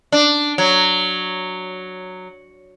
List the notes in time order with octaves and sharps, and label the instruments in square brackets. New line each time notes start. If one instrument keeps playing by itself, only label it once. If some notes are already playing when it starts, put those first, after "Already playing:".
[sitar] D4
F#3